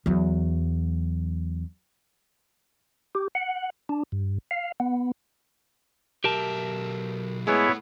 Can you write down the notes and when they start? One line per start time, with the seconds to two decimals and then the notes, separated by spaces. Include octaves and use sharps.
0.06 E2 F#3
3.15 G4
3.35 F#5
3.89 D4
4.12 G2
4.51 F5
4.80 B3
6.24 B1 G4 A#4 E5 A5
7.47 A2 G#3 B3 E4 G#4 B4 C#5